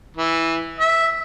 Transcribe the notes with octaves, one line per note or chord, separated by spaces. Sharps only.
E3
E5